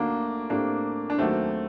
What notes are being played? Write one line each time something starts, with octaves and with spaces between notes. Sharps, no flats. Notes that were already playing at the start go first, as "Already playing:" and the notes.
Already playing: D2 D3 A3 A#3 D4 D#4 F#4
A2 A3 A#3 C4 D4 G4
D4
D#2 D#3 F#3 A3 A#3 C4 F#4